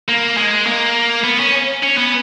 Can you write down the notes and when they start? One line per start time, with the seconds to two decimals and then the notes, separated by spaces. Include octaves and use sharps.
0.09 A#3
0.37 G#3
0.67 A#3
1.24 B3
1.40 C#4
1.83 C#4
1.98 B3